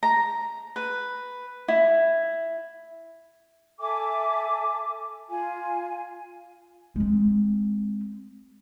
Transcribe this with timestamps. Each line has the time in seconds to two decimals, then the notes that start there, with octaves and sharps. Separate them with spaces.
0.03 A#5
0.76 B4
1.68 E4
3.79 A4 E5 G#5 D6
5.29 F4 F5 G#5
6.96 G#3 C4